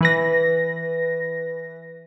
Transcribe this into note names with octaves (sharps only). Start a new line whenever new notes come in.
E3 B4 A#6